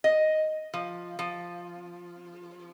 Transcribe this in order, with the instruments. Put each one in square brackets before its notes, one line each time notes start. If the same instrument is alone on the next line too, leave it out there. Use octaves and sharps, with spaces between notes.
[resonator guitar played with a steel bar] D#5
F3
F3